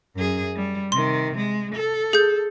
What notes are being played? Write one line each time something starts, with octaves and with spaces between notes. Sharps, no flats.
F#2 G#4
G3
C3 D#3 C6
G#3
A4
G#4 G6